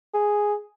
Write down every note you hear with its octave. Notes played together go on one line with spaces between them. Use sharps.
G#4